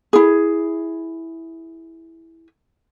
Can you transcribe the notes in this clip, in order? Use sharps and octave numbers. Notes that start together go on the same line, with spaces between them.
E4 G#4